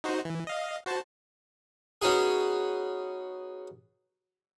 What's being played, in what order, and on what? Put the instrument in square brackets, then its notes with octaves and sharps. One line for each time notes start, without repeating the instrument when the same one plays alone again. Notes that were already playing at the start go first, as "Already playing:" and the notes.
[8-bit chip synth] D#4 F#4 C5
E3
D#5 F5
F#4 C5 A5
[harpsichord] B3 C#4 D#4 F#4 G#4